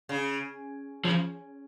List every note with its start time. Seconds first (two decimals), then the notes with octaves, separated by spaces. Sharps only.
0.09 C#3
1.04 C#3 F3